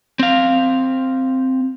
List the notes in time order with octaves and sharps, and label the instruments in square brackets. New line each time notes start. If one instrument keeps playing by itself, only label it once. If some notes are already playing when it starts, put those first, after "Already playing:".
[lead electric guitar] C4 F5